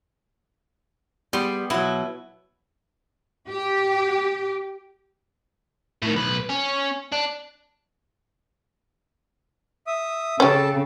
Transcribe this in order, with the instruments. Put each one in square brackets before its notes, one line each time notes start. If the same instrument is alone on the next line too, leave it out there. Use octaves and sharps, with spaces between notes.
[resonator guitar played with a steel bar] G3 [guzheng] B3 C6
[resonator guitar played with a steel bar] B2 F#3 [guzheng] E4
[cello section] G4
[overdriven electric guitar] A2 D#3
B1 B4
C#4
D4
[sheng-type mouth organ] E5 D#6
[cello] C#3 [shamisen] C#4 G4 [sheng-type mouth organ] A4 A5